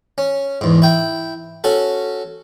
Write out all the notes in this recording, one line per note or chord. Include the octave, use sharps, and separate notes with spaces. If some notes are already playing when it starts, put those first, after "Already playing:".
C#4
E2 G#2
E4 G5
C#4 F#4 A4